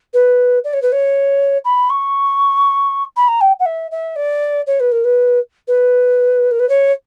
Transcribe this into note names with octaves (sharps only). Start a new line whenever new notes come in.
B4
D5
C#5
B4
C#5
B5
C#6
B5
A#5
G5
F#5
E5
E5
D5
C#5
B4
A#4
B4
B4
A#4
B4
C#5